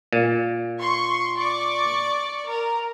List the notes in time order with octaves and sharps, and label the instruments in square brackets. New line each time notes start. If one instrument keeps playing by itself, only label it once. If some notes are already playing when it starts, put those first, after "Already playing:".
[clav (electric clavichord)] A#2
[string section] C6 C#6
D5 C#6 D6
A#4